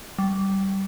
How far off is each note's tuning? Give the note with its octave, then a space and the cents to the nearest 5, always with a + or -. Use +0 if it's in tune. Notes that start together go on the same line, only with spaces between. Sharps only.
G3 -15